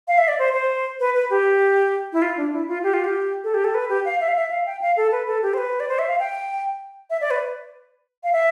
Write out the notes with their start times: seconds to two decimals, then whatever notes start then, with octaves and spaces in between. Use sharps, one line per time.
0.08 F5
0.18 E5
0.28 D5
0.39 C5
0.53 C5
1.00 B4
1.14 B4
1.30 G4
2.13 E4
2.22 F4
2.37 D4
2.53 E4
2.68 F4
2.83 G4
2.94 F4
3.04 G4
3.44 A4
3.54 G4
3.64 A4
3.74 B4
3.90 G4
4.05 F5
4.20 E5
4.28 F5
4.35 E5
4.51 F5
4.66 G5
4.81 F5
4.97 A4
5.12 B4
5.27 A4
5.42 G4
5.54 C5
5.58 B4
5.80 D5
5.88 C5
5.99 E5
6.09 F5
6.19 G5
7.10 E5
7.21 D5
7.31 B4
8.24 F5
8.33 E5